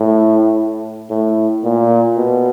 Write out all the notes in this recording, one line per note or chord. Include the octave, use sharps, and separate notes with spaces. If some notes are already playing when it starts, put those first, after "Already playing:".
Already playing: A2
A2
A#2
B2